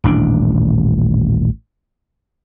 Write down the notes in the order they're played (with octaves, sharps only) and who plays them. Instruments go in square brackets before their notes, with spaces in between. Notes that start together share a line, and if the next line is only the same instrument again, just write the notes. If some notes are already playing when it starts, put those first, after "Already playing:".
[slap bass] D#1 A1 D4